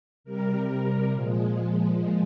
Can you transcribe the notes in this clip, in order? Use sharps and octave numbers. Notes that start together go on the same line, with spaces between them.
C3 G3 A#4
A#2 F3 G#3